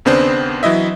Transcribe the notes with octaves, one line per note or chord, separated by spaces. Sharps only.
D#2 C#3 B3 C4 D4 C5
E3 F#3 E4 D#5 E5